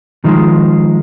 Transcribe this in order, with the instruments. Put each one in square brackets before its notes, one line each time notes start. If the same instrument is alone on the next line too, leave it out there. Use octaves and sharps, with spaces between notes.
[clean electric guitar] D#3 F3 G#3